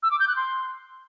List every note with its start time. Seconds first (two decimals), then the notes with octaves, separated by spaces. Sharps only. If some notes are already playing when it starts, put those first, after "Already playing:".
0.03 E6
0.11 D6
0.20 G6
0.28 F#6
0.36 C6